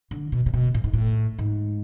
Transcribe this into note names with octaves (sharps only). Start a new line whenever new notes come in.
D3
B2
C3
B2
A2
G#2
A2
G#2